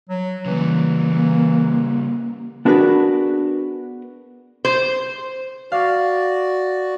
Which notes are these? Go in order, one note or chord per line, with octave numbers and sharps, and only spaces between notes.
F#3
C#3 E3 G3 A#3
B3 D4 F#4 G#4 A#4 B4
C5
F#4 D5 F5